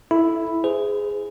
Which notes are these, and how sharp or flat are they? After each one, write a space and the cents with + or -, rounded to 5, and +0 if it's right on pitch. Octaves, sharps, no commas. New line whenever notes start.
E4 +0 A4 -15
G#4 +0 C5 -35